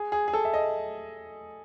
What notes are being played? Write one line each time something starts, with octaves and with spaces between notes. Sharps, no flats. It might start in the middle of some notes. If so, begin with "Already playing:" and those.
Already playing: G#4
G#4
G#4
A4
E5
D#5